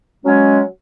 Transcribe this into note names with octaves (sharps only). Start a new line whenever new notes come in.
F#3 G#3 C#4